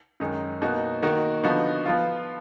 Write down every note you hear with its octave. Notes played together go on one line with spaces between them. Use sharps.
F#2 D#3 G#3 D#4
B2 A#3 D#4 F#4
D#3 A#3 D#4 F#4
D3 F3 B3 D#4 F#4
F3 B3 F4